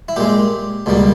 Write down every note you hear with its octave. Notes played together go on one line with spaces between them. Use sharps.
E4
A#2 G#3 G4
C#2 B2 G3 A#3